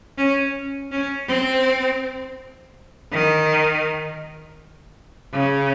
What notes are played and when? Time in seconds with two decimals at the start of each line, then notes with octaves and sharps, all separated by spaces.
0.18 C#4
0.91 C#4
1.28 C4
3.12 D#3
5.33 C#3